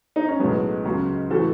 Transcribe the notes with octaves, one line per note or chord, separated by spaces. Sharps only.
D#4
C#4
B1 A2 F#3 G#3 B3
C#2 C#3 F#3
A2 E3 F#4 A4